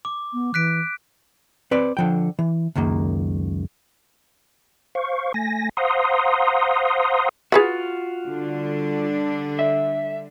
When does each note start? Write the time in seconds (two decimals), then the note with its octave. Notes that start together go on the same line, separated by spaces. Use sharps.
0.05 D6
0.33 B3
0.54 E3 F#6 B6 D7
1.71 C4 B4 D5
1.97 D3 F3 G5
2.39 E3
2.75 C#2 F#2 D#3 A#3
4.95 C5 F5 C#6
5.34 A3 G#5 A#6
5.77 C5 F5 F#5 A#5 C6 D#6
7.52 F4 F#4 G#4 B4 F#5
8.25 D3 G3 D4
9.59 E5